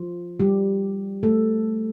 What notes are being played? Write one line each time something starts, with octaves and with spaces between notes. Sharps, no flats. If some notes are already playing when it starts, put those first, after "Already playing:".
Already playing: F3 F4
G3 G4
A3 A4